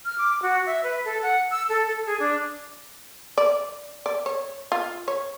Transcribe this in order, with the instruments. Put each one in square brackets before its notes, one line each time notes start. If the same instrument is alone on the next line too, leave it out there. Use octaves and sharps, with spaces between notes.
[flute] F6
D6
F#4
E5
B4
A4
F#5
E6
A4
A4
G#4
D4
[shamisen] D5
D5
C#5
F4
C#5